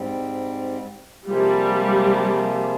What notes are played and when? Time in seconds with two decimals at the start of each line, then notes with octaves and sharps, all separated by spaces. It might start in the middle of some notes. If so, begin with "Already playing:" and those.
Already playing: G#2 G3 C4
1.27 C3 F3 G3 A#3 F4 G#4